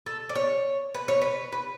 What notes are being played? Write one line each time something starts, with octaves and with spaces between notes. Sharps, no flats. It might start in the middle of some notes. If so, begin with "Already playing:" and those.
A4
D5
C#5
B4
C#5
B4
B4